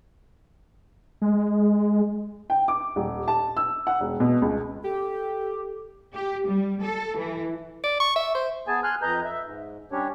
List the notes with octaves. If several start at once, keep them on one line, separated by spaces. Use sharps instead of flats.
G#3
G5
D6
D#1
A5
E6
F#5
E1
B2
C#2
G4 A4
G4
G3
A4
E3
D5
C#6
E5
C5
B3 G#4 G#5 A5
G#5 C6 F6 F#6
F2 B4 D#5 A#5 G6
E5
G#2
G3 C#4 D4 G4 C#5